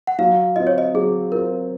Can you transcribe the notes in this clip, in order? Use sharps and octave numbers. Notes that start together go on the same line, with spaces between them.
F#5
F#3 F5
C4 F4 D#5
C#5
D#5
F#3 G#4
C4 F4 A#4